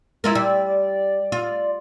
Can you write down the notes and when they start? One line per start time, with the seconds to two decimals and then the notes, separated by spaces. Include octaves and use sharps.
0.24 G#3 E4 F4 A#4
0.35 G3 D5
1.32 F4